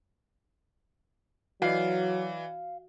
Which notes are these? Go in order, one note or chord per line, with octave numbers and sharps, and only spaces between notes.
E3 F#3 F#4 D5 D#5 F5